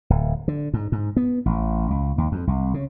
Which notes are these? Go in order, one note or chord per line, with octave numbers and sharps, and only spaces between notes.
D1
D3
G#2
G#2
B3
A1
C#2
D#2
F2
C2
C#3